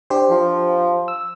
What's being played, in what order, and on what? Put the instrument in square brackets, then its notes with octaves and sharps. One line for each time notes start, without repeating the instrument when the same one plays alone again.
[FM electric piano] D4 G4 C5
[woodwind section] F3
[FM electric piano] E6